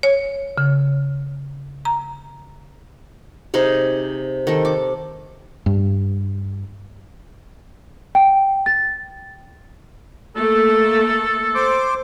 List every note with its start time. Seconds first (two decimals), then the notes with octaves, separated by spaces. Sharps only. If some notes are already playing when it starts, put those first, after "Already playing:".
0.03 C#5
0.58 C#3
1.85 A#5
3.54 C3 D#4 G#4
4.47 D#3 A4
4.65 D6
5.66 G2
8.15 G5
8.66 A6
10.36 A3 A#3 A4
11.55 C5 D6